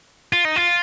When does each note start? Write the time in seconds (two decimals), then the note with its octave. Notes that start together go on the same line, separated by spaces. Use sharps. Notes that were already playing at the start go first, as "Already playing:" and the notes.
0.33 F4
0.45 D#4
0.56 F4